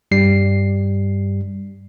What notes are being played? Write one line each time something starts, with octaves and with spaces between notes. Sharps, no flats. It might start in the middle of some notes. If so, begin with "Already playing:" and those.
G2 G3 C7